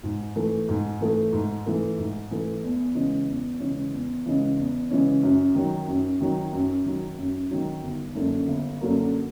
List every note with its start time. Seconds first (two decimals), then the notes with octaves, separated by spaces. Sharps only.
0.03 G#2
0.36 E3 A3
0.69 G#2
1.01 E3 A3
1.33 G#2
1.66 E3 A3
1.98 G#2
2.31 E3 A3
2.63 E2
2.95 C#3 E3 G#3 C#4
3.28 E2
3.60 C#3 E3 G#3 C#4
3.93 E2
4.26 C#3 E3 G#3 C#4
4.58 E2
4.90 C#3 E3 G#3 C#4
5.23 F#2
5.55 D#3 F#3
5.88 F#2
6.21 D#3 F#3
6.53 F#2
6.85 D#3 F#3
7.18 F#2
7.51 D#3 F#3
7.83 G1
8.15 F#2 D3 F#3 A#3
8.48 G1
8.81 F#2 D3 F#3 A#3